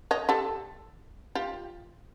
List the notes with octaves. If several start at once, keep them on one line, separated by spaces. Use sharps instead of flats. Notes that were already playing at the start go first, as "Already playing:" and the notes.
C#5 D#5
G4 A4
F4 G4